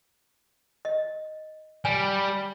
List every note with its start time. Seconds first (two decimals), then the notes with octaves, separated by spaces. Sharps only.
0.85 D#5
1.85 G3 G#5